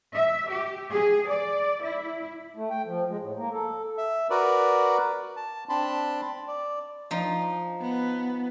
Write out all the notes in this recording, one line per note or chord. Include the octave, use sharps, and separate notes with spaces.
E5
G4
G#4
D5
E4
A3
G5
F3
G#3
A2
A#3
A4
E5
F#4 A#4 B4 D5
A5
C4 D4 A5 B5 C6
D5
F3 D#4
B3